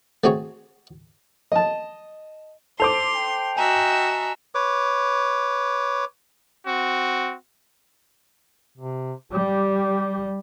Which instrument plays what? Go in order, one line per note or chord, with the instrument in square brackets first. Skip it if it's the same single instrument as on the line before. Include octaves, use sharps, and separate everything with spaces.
[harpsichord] A3 C4 F#4 G#4 C#5
[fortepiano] D#5 A5
[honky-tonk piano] A4 C5 D6 [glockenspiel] A5 C7 F7 [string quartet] C6
[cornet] G5
[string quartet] F#4 D#5 E5 [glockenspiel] G#5 A#5 E7
[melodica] B4 C#5 D6
[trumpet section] C4 F#4
[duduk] C3
[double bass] G3 [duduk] G4